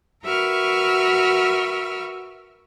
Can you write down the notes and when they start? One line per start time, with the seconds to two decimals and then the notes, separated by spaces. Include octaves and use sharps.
0.24 F#4 A#4 B4 E5 C#6 F6